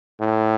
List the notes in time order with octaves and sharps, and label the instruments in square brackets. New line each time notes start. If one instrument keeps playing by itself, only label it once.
[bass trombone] A2